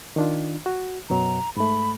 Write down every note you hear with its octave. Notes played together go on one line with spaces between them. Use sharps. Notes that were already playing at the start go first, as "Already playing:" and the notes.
D#3 D4 F4
F#4
F#2 B2 F#3 A#5
G#2 A3 B5